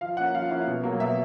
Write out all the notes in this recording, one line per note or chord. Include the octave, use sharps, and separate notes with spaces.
F3 F5
A#3 C#4 E4 F#5
F3 F5
A#3 C#4 E4
B2
F#3 A#3
B2 E5